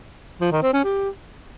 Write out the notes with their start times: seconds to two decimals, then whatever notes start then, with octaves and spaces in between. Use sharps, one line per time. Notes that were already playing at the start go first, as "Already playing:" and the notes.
0.41 F3
0.52 D#3
0.62 C4
0.73 C#4
0.84 G4